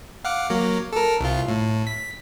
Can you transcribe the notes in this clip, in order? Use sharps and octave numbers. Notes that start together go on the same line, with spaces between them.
F5 F#5 D6
F#3 A#3
A4 A#4
C2 F4
A2
B6